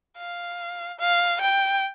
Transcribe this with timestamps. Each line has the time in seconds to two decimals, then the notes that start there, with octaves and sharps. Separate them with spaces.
0.18 F5
0.99 F5
1.41 G5